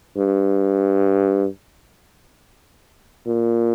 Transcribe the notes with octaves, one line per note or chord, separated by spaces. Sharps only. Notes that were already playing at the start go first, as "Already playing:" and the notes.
G2
A#2